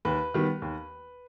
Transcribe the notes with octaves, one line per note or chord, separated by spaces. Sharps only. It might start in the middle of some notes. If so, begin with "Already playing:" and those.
D#2 B4
D#3 G3 B3
D#2